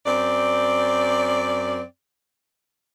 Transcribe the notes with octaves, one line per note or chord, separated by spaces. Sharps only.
F#2 C4 D5